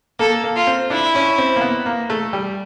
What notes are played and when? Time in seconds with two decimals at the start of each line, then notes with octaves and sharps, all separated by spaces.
0.19 A#3 A4
0.44 A#3
0.56 F4
0.67 C4
0.90 D4 E4
1.15 C#4
1.38 C4
1.56 A#3
1.61 B3
1.86 A#3
2.10 A3
2.33 G3